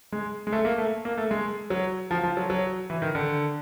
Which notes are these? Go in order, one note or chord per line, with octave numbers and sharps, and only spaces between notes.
G#3
G#3
A3
A#3
A3
A#3
A3
G#3
F#3
F3
F3
F#3
F#3
E3
D#3
D3